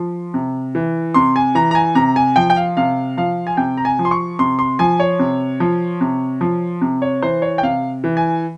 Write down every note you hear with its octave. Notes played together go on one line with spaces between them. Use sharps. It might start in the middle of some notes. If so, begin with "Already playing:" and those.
Already playing: F3
C3
E3
C3 C6
G#5
E3 A#5
A#5
G#5
C3 A#5
G#5
F3 G5
G5
F5
C3 F5
F3 F5
G#5
C3 G5
A#5
G#5
F3
C6
C#6
C3 C6
C6
F3 G#5
C#5
C3
F3
C3
F3
C3
C#5
E3 C5
C#5
G5
C3 F5
E3
G#5